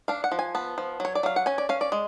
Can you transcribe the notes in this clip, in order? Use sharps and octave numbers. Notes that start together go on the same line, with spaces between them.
D4 F5
F#5
F3
G#5
B3 A5
F3
F#3 C#5
D5
F#3 F5
F#5
C#4 G#5
D5
C#4 F5
D5
G#3